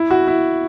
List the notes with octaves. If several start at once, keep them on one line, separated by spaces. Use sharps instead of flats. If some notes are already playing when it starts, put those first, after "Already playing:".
Already playing: E4
F#4
E4